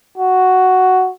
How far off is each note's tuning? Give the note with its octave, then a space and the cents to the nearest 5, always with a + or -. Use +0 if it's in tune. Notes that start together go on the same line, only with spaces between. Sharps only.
F#4 +5